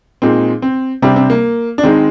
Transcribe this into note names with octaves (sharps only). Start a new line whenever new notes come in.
A#2 G#3 C4 D#4
C4
C3 G3 C4 D4
C4
A#3
D4
D#3 G#3 C4 D#4